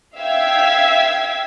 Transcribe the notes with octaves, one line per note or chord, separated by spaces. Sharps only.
E5 F5 G5 E6 G#6 B6